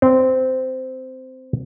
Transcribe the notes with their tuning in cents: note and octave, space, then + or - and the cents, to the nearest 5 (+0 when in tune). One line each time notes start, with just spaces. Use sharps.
C4 -15